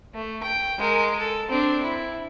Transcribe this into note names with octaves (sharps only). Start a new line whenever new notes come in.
A3
G5
G#3 A#4
A4
C4 D4
E4